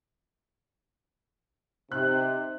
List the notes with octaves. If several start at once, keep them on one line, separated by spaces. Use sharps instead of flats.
C3 D#4 C5 F#6